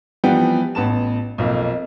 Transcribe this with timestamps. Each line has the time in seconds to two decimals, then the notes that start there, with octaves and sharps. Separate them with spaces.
0.24 E3 F3 G3 B3 G5
0.75 A1 B3 A5 E7
1.38 B1 F2 A#3